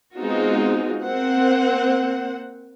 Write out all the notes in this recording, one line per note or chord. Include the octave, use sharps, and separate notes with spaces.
G#3 B3 C4 D#4 F4 F#4
A#3 C4 C5 F#5